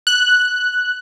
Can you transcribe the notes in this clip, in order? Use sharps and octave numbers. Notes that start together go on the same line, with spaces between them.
F#6